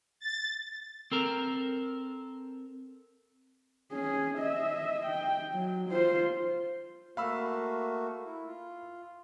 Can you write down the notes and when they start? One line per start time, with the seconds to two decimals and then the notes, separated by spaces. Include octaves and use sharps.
0.20 A6
1.12 C4 A4 A#4
3.92 C#4 G#4
4.38 D#5 E5
5.06 G5
5.54 F#3
5.90 F4 C5
7.17 A3 A#3 F#4 F5 B5 E6
8.26 E4
8.46 F4